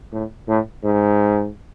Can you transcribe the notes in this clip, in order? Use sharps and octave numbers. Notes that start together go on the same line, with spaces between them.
A2
A2
G#2